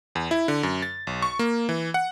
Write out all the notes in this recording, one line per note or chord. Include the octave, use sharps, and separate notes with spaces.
E2
E4
D3
F#2
A6
B1
C#6
A#3
E3
F#5